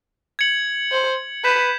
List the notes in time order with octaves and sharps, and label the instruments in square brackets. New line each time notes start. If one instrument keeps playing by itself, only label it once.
[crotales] G#6 C#7 F#7
[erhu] C5
[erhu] B4 [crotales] G6 B6 E7